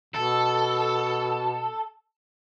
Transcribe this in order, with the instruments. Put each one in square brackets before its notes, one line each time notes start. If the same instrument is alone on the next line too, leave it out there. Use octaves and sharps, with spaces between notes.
[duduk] B2 [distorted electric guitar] A4